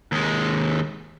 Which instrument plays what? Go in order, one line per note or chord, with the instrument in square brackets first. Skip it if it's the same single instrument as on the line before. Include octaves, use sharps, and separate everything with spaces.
[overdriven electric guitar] D#2 G#3